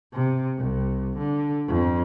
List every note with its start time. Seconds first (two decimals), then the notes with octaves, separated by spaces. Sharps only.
0.13 C3
0.57 C2
1.18 D3
1.67 F2